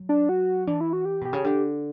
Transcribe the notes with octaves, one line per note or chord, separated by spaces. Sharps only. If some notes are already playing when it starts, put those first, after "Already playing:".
Already playing: F#3
D4
F#4
E3 D4
E4
F#4
G4
B2 G4
C#3
D3 G4